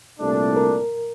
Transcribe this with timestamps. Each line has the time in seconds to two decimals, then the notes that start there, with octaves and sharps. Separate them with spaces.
0.20 C2 A#2 A3 D4
0.57 A#4